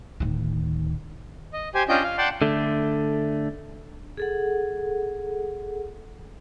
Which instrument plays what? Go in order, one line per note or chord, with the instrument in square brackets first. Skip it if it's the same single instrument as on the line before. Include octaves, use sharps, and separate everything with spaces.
[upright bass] D1 D#3
[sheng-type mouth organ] D#5
G4 C5 G#5
C#4 D4 F4 D#5 G5 G6
F5
D5 F#5 G5 A5 C6
[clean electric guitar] D3 A3
[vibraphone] G#4 A4 F#5